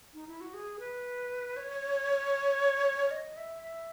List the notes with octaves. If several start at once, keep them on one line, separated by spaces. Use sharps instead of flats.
D#4
E4
F#4
G#4
B4
C#5
D#5
E5
E5